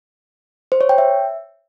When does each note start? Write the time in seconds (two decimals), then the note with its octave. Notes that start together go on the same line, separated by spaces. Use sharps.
0.72 C5
0.81 C#5
0.89 G5
0.98 E5